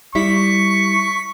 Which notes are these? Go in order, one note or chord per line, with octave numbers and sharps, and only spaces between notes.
G3 E4 C#6 B6